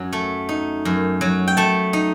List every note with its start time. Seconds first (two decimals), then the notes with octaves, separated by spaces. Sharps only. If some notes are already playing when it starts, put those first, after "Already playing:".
Already playing: F#2 F#3
0.13 A3
0.49 D#4
0.85 F#2
1.21 F#3
1.48 G5
1.57 A3 A5
1.93 D#4